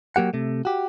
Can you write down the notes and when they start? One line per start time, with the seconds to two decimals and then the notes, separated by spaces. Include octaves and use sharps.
0.16 F#3 A#3 G4 F#5
0.33 C3 A3
0.65 F#4 G4